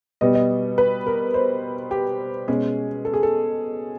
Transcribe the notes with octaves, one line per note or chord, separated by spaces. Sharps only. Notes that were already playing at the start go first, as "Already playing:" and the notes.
B2 G3 B3 D#5
D#5
B4
A#4
C5
G4
B2 G#3 C#4 G#4
A4
G#4
A4